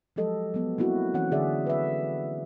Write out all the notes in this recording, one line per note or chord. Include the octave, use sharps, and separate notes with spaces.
F3 F#3 G#3 G4 A4 D#5
F#3 G#3 B3
A#3 C4 E4 F#4
E3 C#4 C#5 F#5
D3 G#4 D5 E5
B4 E5